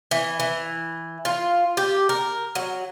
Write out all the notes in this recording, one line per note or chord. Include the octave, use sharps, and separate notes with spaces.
E3
E3
F4
G4
A#4
F#3